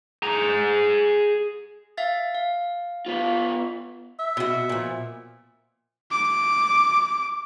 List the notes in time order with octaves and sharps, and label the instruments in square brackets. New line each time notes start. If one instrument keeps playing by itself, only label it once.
[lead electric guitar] G#4 A#5
[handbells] E5 F5 A6
F5
[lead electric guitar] B3 F4
[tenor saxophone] E5
[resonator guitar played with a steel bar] B2 F#4
A#2 F3
[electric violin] D6